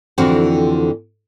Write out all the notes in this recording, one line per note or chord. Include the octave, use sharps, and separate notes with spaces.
F2 D3 E3 C4 F#4 C5